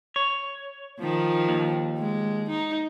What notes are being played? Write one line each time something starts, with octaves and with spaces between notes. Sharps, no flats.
C#5
D#3 F3
D#2
G#3
D#4